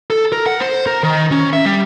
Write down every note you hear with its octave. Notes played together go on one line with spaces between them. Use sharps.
A4
A#4
F#5
C5
A#4
D#3
C#4
E5
G3